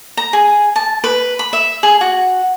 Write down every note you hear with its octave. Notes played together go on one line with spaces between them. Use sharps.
A#5
G#4
A5
B4
B5
E5
G#4
F#4